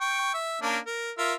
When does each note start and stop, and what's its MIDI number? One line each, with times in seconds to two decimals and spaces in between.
0.01 0.33 79
0.01 0.33 85
0.34 0.60 76
0.62 0.78 58
0.62 0.78 61
0.62 0.78 62
0.86 1.11 70
1.18 1.34 65
1.18 1.34 70
1.18 1.34 76